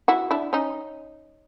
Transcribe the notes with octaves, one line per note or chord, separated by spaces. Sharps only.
E4 F#4
D4 E4
C#4 D#4